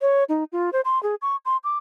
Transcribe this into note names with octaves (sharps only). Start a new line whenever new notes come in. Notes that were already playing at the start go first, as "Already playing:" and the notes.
C#5
D#4
F4
C5
C6
G#4
C#6
C6
D6